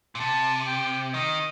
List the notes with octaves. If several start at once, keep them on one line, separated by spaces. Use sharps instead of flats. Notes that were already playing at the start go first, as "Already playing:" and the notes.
A#2
C3 A5
G5
D#3 D#5